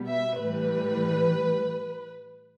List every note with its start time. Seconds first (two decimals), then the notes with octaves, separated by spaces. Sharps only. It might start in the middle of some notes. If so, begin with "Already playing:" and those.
Already playing: B2 G3 B3
0.09 E5
0.39 A2 E3 G3 B4